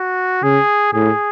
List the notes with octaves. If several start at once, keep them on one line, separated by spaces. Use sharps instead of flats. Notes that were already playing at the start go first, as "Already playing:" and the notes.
Already playing: F#4
C#3 G#4
A2 G#4